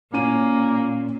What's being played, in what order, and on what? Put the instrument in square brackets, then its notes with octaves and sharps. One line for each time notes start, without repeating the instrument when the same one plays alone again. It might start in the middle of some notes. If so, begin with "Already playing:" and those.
[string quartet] A#2 [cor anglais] A#3 [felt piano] C#4 D#7